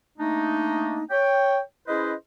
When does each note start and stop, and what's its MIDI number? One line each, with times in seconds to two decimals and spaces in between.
0.18 1.03 57
0.18 1.03 58
0.18 1.03 62
0.18 1.03 63
1.11 1.59 73
1.11 1.59 79
1.87 2.14 61
1.87 2.14 64
1.87 2.14 68
1.87 2.14 71
1.87 2.14 72
1.87 2.14 75